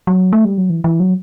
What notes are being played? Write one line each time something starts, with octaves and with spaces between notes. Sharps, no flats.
F#3
A3
G3
F#3
E3
E3
F#3